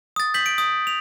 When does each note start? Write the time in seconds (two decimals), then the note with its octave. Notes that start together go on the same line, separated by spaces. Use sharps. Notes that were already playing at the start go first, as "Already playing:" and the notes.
0.16 D#6 A6
0.34 G6 B6 F#7
0.46 D7
0.58 D#6
0.87 F7